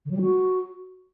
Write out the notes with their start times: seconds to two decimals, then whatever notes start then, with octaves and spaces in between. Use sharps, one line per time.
0.05 D3
0.11 F#3
0.16 G3
0.22 F#4